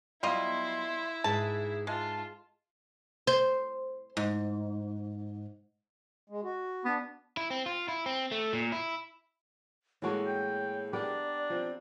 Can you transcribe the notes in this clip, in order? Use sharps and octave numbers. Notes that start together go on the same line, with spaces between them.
F#3 G3 B3 E4 F4 D#5 C6
G#2 G#4 B4 E5 A5
G#3 F4 A5
C5
G#2
G#3
F#4
B3 D4
E4
C4
F4
E4
C4
A3
A#2
E4
A2 E3 G#3 A#3 F#4 A4 C#5
G5
B3 D4 G4 A#4 D5
F3 C4